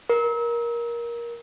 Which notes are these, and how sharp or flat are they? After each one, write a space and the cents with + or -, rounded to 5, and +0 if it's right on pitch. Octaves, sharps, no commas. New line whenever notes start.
A#4 +15